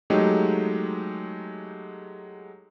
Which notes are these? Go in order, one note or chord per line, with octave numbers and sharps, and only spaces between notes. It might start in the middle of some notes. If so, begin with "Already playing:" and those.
F#3 G#3 A3 D#4 G4